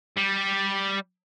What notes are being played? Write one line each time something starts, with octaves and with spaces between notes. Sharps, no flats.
G3